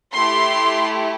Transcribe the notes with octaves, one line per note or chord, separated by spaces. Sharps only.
A3 E4 G4 C6